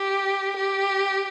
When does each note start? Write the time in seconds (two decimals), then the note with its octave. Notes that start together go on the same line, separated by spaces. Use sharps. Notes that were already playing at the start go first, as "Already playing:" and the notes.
Already playing: G4
0.57 G4